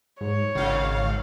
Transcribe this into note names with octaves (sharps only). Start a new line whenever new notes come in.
G#2 C#5
G#1 G2 C#3 C#4 F5